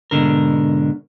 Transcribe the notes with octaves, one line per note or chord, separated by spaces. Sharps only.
G#2 B2 D3 A#4